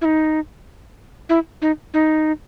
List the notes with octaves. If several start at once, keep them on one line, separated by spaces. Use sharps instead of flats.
E4
D#4
E4
D#4
D#4